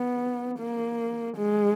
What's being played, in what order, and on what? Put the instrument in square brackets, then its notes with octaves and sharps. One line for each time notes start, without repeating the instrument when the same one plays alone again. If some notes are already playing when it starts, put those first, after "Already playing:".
Already playing: [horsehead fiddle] B3
A#3
G#3